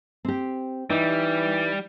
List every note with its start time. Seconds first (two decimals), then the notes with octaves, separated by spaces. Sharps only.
0.25 C4 G4
0.90 E3 G3 D#4